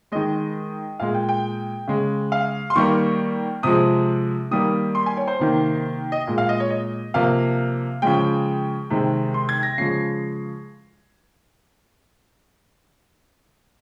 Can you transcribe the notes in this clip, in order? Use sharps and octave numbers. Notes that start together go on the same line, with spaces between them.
D#3 G#3 D#5
A#2 G#3 F5
G5
G5
C#3 G#3
F5
C6
D#3 G3 A#3 C#6
C3 F3 G#3 D#6
D#3 G3 A#3 D#6
C6
G#5
C#5
C5
C3 D#3 A#3
D#5
A#2 G#3
F5
D#5
C#5
D#5
C3 F3 A#3 F5
C#3 F3 G#3 G5
C3 D#3 G#3
C6
G#6
A#6
C#3 F3 G#3 C7